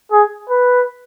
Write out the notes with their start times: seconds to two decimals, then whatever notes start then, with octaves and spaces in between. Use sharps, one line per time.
0.12 G#4
0.49 B4